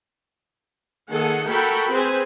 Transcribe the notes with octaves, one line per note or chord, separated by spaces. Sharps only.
D#3 A#3 G#4 A4 F#5
F#4 A4 A#4 G5 B5
C4 G#4 B4 C5 G#5